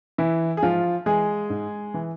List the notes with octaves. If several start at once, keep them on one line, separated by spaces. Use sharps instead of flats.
E3 E4
G#4
G#2 F3 F4
E3 G#3 G#4
G#2
E3